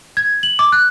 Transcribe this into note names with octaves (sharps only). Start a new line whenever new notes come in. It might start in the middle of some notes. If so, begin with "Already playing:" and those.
G#6
F#7
D6
F#6